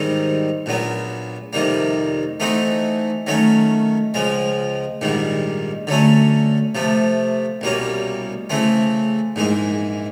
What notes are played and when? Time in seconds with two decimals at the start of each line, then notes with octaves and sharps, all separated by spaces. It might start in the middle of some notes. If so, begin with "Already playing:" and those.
Already playing: G#2 D#3 G3 C4 D#4
0.66 A#1 A#2 F#3 B3
1.53 F2 C3 D#3 G3 A#3
2.40 E3 A3 C4 D#4 F#4
3.27 D#3 F#3 A3 C#4
4.14 C#2 C#3 F3 G#3
5.01 A#1 G#2 D#3 G3
5.87 D3 F#3 A3 C#4
6.75 C3 F3 A3
7.61 C2 B2 G3 A#3 C#4
8.50 C#3 E3 A3 C4
9.36 A#1 G#2 E3 G#3